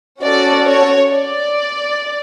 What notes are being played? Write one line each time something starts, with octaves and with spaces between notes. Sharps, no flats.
C#4 F#4 A4 D5
C#5
D5